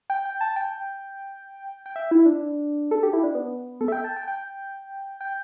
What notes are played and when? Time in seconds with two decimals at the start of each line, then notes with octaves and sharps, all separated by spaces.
0.10 G5
0.25 G5
0.41 A5
0.56 G5
1.86 G5
1.96 E5
2.11 E4
2.26 D4
2.91 A4
3.03 G4
3.13 E4
3.23 D4
3.35 B3
3.81 A4
3.88 E5
3.92 G5
4.04 A5
4.17 G5
4.28 G5
5.21 G5